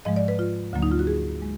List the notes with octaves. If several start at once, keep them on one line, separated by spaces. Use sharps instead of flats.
G#2 F3 G#3 D#5
D5
B4
F4
D2 D3 F#3 A#3
D#4
F4
F#4
G#4
G#3